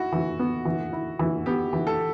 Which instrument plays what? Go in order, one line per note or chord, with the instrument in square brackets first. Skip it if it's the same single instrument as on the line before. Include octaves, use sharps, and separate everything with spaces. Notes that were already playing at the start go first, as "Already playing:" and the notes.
Already playing: [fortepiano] E4 [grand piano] F#4
[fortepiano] E3
B3
E3
E4
E3
[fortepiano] B3 [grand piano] G4
[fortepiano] E3
[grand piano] A4